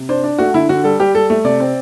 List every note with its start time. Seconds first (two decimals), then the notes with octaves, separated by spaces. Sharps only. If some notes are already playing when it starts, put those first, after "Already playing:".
Already playing: C3
0.09 D4 C5
0.23 D4
0.38 A3 F#4
0.54 D3 E4
0.69 D3 F#4
0.84 G3 A4
0.99 G3 G4
1.15 G3 A4
1.30 A3
1.44 C3 D5
1.60 C4